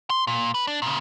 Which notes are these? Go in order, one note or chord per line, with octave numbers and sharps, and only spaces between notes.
C6
A#2
B4
D4
A#2 C#3